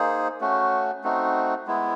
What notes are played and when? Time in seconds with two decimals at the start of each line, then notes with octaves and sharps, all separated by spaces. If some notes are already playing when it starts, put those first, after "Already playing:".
Already playing: A#3 D#4 G#4 C5
0.41 A3 C#4 F#4
1.04 A3 C4 D#4 F#4
1.67 G#3 B3 E4